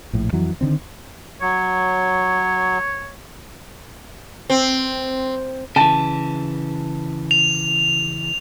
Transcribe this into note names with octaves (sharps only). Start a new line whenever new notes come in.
A#1 A2
F2 E3 F#3
D3 D#3 C4
F#3 C#5
C4
C#3 E3 A5
F7